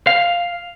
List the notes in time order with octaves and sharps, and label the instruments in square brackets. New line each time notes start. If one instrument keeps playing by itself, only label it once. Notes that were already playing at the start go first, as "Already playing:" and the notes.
[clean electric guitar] F5